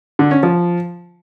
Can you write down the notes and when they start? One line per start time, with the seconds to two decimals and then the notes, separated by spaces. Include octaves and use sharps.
0.19 D3
0.31 C#4
0.43 F3